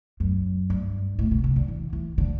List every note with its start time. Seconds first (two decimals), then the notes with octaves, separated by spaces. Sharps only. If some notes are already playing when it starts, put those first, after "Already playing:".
0.20 F#2
0.70 G2
1.19 A2
1.31 B2
1.44 C3
1.56 D3
1.68 E3
1.93 E3
2.18 D3